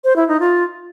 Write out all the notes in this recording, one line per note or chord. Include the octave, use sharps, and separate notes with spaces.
C5
E4
D#4
F4